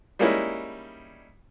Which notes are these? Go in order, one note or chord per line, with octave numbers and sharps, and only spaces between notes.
G3 G#3 A#3 C#4 D#4 E4